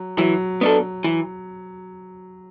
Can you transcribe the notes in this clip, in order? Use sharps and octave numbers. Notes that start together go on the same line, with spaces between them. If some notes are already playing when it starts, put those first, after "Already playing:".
Already playing: F#3
E3 F#3
B3 D4 A4
E3